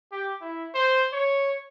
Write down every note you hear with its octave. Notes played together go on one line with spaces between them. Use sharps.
G4
E4
C5
C#5